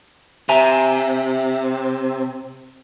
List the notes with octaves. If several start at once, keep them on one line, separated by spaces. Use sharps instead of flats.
C3 E5 G#5 A#5